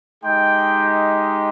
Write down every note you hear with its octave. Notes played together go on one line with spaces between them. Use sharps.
G#3 D#4 G4 G5